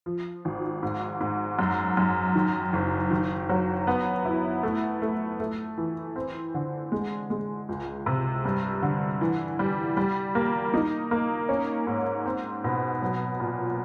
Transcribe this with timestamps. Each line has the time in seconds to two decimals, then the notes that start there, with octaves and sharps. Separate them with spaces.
0.06 F3
0.45 G#1
0.83 G#2
1.20 G#2
1.59 F#2
1.97 F#2
2.35 D#3
2.73 F#1
3.10 D#3
3.49 F#3
3.87 B3
4.25 E4
4.63 A3
5.02 A3
5.40 A3
5.78 E3
6.16 C4
6.54 D3
6.92 G#3
7.30 G#3
7.69 C#2
8.06 C3
8.45 G2
8.82 D3
9.21 E3
9.59 G3
9.97 G3
10.35 A#3
10.74 D#4
11.11 A#3
11.49 C#4
11.87 G#2
12.26 C4
12.64 B2
13.02 F#3
13.40 A#2